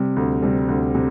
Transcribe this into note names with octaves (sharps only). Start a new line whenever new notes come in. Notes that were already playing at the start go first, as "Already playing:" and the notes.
Already playing: C3 G3
D2
C3 G3
D2
C3